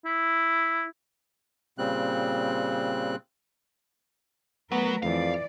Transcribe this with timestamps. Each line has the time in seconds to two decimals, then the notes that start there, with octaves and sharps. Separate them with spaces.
0.05 E4
1.78 A#2 C#3 G3 C4 F#6
4.72 F#3 A3 B3 A#4 B4
5.02 F2 E3 D5 F5